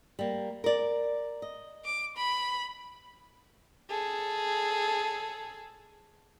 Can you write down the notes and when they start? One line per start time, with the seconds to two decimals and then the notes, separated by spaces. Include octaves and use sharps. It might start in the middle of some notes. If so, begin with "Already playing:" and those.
0.19 G3 A#3
0.64 A#4 D5
1.42 D#5
1.85 D6
2.17 B5
3.90 G#4 A4